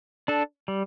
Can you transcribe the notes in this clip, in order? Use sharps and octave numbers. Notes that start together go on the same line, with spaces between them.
D4 A4
G3